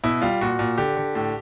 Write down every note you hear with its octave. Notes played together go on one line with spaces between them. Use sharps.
B2 E4
G3 F4
A#2 F#4
A#2
D3 G4
D3
A2